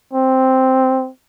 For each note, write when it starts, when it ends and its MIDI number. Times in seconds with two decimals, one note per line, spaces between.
0.13 1.09 60